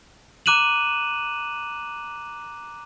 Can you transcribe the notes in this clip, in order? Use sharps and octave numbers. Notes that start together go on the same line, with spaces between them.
A#5 D6 F#6 D#7 E7 F#7